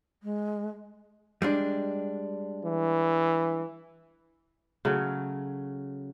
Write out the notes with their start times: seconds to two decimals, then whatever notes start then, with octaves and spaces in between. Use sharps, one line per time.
0.23 G#3
1.42 G3 G#3 D4
2.64 E3
4.85 C#3 F#3 A3